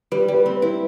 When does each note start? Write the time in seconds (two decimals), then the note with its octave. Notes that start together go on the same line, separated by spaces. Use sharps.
0.12 G3 B4
0.28 G3
0.34 B4
0.46 C4
0.57 B4
0.62 E4